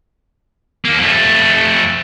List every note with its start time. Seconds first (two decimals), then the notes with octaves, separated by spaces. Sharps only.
0.85 D#2 A#3
1.00 F2 A3